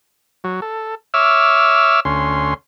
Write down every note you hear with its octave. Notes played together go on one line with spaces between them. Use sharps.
F#3
A4
C#5 E5 D6 E6 F6
D2 C#4 C6